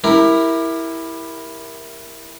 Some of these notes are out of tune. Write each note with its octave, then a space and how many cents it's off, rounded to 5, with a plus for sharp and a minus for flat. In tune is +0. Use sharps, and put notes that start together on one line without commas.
E4 -5 G4 +25 A#4 +0